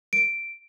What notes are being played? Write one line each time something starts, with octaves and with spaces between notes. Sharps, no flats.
D7